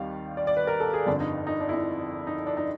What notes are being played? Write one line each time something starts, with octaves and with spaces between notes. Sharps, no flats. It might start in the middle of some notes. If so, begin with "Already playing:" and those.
Already playing: D#2 D#3 G3 C4 F5
D5
D5
B4
A#4
A4
G#4
G1 F2 D3 D4
D#4
D#4
D4
E4
D#4
D#4
D4
D#4